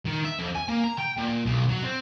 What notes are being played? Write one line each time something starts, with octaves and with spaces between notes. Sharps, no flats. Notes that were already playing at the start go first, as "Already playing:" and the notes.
D#3
E5
F2
G#5
A#3
A#5
G5
A#2
B1
F#3
C4